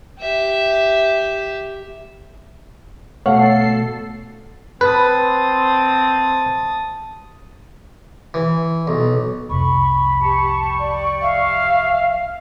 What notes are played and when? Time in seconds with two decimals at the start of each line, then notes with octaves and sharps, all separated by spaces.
0.21 G4 E5
3.26 B2 A3 A4 C#5 F5 F#5 C7
4.81 C4 B4 A5 D#6
8.34 E3
8.87 B1
9.49 C2 F2 B5 C#6
10.21 G4 A5 C#6
10.79 D5
11.22 E5 F5